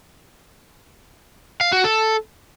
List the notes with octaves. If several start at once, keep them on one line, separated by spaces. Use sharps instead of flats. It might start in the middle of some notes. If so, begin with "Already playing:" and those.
F5
F#4
A4